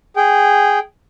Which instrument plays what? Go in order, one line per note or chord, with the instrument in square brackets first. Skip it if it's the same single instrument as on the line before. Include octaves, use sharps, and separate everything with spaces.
[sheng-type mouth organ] G#4 G5